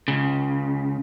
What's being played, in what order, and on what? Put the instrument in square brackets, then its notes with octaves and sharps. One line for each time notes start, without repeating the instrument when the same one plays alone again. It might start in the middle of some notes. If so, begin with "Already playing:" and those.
[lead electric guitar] C#2 C#3